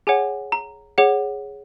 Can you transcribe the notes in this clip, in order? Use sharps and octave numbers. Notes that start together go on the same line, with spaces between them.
G#4 C#5 F#5 G#5
A#5
G#4 C#5 F#5